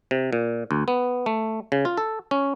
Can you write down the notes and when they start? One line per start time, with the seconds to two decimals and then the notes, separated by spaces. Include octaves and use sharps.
0.11 C3
0.33 A#2
0.71 D2
0.88 B3
1.26 A3
1.72 C#3
1.85 F4
1.97 A4
2.31 C#4